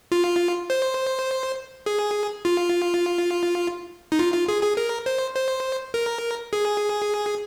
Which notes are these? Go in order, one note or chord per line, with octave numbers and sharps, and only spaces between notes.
F4
C5
G#4
F4
D#4
F4
F4
G#4
G#4
A#4
C5
C5
A#4
G#4